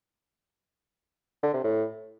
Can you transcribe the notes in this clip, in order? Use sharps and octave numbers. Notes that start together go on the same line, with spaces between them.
D3
C3
A2